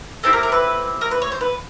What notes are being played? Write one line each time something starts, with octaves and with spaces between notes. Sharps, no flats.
A3 C4 E4 G4 A4
A#4
A#4
B4
A#4
B4
C#5
C5
B4